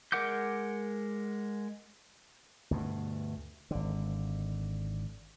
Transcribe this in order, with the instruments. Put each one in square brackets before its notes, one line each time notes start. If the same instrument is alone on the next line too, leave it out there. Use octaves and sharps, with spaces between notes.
[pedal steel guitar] G#3 A#4 F#5 D6 G6
[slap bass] D2 G2 B2
G#1 D3